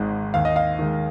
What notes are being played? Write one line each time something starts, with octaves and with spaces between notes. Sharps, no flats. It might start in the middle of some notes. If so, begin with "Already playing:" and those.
Already playing: G#1 G#2 G#3
D#2 F5
D#5
F5
D#3 G#3